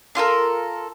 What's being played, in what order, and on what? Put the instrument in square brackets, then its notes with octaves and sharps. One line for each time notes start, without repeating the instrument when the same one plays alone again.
[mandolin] D4 F4 A4 A#4